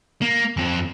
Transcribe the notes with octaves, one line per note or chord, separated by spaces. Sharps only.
A#3
F2 C4